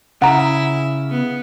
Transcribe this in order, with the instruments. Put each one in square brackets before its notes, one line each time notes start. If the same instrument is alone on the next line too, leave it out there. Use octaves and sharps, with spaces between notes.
[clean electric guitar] C#3 [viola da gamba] E4 [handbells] F#5 A#5
[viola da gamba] B3